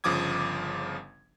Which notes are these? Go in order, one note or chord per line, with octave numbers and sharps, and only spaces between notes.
G1 C#3 F3 D6 D#6 G#6